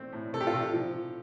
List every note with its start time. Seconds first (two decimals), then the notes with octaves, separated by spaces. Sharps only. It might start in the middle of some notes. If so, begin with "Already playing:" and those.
Already playing: A3 C4
0.12 A2
0.33 C3 A4
0.41 G4
0.47 F4 A4
0.53 C3
0.74 F3